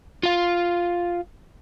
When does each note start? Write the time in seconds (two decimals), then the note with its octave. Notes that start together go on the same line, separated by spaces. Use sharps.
0.23 F4 F5